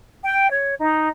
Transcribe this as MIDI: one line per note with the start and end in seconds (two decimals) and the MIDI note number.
0.23 0.50 79
0.50 0.74 73
0.81 1.08 63